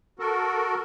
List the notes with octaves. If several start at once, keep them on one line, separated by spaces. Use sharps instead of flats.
F#4 A4 A#4